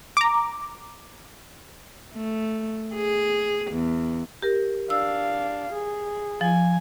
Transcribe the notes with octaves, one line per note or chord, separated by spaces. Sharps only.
A#5 D6
A3
G#4
E2
G4 A#4
D4 F5 E6
G#4
F3 G#5